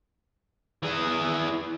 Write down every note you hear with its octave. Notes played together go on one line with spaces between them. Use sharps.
E3 G#4